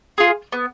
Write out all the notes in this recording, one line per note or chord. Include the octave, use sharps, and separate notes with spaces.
F4 G#4
B3